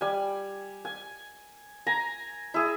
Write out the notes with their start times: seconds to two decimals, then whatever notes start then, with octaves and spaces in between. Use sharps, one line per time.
0.01 G3 G#5
0.85 G#5
1.87 G#5 A#5
2.54 E4 G#4